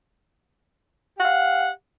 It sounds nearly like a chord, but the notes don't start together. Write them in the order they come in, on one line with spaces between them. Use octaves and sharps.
G4 F#5 F5